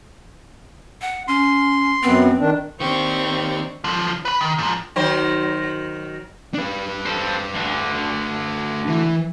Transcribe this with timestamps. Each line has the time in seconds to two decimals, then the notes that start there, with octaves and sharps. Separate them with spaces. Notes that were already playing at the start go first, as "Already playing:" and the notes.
1.02 F#5
1.28 C#4 C6
2.03 F#2 B3 C4
2.40 D#3 D4
2.80 D#3 C4 D4 G4 C#6
3.84 D3 F3
4.25 B4 B5
4.41 D#3
4.58 G#2 F3
4.96 D#3 F#3 C5
6.54 D4 B4
7.05 C4 A4
7.54 D2 D3
8.87 E3